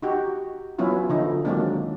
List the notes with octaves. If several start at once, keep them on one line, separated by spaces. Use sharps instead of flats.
D#4 F#4 G4
F#3 B3 C#4 E4 F4
D3 F3 D#4
D#3 F#3 G#3 A#3 C4 D4